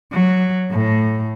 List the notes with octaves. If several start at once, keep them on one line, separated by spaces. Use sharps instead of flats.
F#3
A2